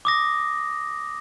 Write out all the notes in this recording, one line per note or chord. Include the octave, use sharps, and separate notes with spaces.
D6 D#6 A#6